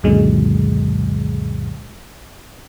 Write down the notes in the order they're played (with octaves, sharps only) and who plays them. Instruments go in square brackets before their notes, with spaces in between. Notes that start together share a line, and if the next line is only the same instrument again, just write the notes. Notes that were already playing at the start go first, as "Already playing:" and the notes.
[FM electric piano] C#2 F#2 A#2 D3 F#3 G#3